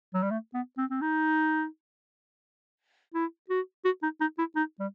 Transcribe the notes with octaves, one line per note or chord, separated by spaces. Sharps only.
F#3
G3
A3
B3
C4
C4
D#4
E4
F#4
F#4
D#4
D#4
E4
D#4
G3